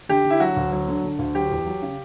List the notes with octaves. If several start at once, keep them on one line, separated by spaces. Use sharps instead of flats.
D3 G4
D3
E4
F#3 F#4
D2
F#3
D3
D3
D2
F#3 G4
E2
F#3
C#3